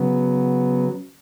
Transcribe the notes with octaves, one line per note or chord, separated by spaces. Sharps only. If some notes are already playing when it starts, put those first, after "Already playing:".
Already playing: C#3 F#3 B3